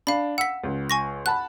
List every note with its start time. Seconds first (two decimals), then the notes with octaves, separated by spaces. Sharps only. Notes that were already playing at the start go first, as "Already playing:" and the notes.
0.07 D4 F5 B5
0.38 F#5 E6 B6
0.64 C#2
0.90 G#5 C#6 A#6
1.26 F#5 A5 B5 F#6